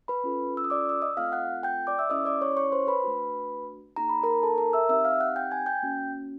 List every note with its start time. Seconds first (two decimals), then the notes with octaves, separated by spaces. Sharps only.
0.08 B4 B5
0.24 C#4 F4 A4
0.57 E6
0.64 D#6
0.70 D5 D6
0.89 E6
1.02 D#5 D#6
1.17 A3 C4 F4 A4 F5 F6
1.32 F#5 F#6
1.63 G5 G6
1.87 D5 D6
1.99 E5 E6
2.10 C#4 E4 A4 D#5 D#6
2.25 D5 D6
2.41 C#5 C#6
2.57 C#5 C#6
2.72 C5 C6
2.87 B4 B5
3.04 A3 D4 F#4
3.96 A#3 D#4 G#4 A#5
4.09 B5
4.23 A#4 A#5
4.43 A4 A5
4.58 A#4 A#5
4.73 E5 E6
4.89 C4 D#4 G4 E5 E6
5.05 F5 F6
5.20 F#5 F#6
5.36 G5 G6
5.51 G#5 G#6
5.66 G5 G6
5.83 A#3 C#4 F#4